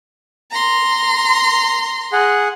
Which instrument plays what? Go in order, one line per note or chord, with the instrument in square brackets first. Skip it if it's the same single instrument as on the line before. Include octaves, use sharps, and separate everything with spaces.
[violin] A#5 C6
[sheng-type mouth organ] G#4 F#5